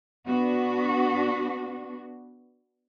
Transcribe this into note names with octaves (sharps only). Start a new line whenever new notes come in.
B3 D4 F#4